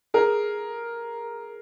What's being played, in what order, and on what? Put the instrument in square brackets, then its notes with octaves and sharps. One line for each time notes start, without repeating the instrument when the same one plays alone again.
[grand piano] G#4 A#4